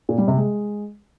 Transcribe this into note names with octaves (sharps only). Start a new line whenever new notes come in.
A#2
G3
C3
G#3